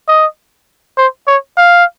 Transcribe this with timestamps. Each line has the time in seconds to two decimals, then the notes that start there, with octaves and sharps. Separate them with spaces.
0.08 D#5
0.98 C5
1.28 C#5
1.57 F5